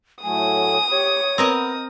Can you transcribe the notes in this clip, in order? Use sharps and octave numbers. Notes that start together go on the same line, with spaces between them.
A2 F#3 A3 G#5 D#6
G4 C#5
B3 C4 A#4 B4 D#5